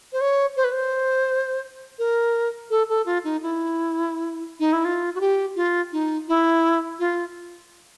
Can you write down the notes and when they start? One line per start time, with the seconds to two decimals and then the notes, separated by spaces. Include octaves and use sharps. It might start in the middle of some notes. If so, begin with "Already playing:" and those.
0.13 C5
0.21 C#5
0.57 C5
0.64 B4
0.72 C5
1.99 A#4
2.70 A4
2.89 A4
3.06 F4
3.24 D#4
3.42 E4
4.60 D#4
4.73 E4
4.85 F4
5.15 F#4
5.20 G4
5.56 F4
5.92 D#4
6.28 E4
6.99 F4